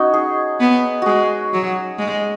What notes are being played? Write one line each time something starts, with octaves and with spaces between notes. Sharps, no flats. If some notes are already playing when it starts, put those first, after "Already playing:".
Already playing: C#4 D#4 F#4
G#4
B3
G#3 F#4 G#4
F#3
G#3